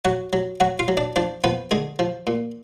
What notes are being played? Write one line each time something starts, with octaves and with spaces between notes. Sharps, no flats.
F#3 F#4 F#5
F#3
F#3 F#4 F#5
F4 F5
F#3
D4 D5
F3 D4 D5
F3 B3 B4
D3 G#3 G#4
F3
A#2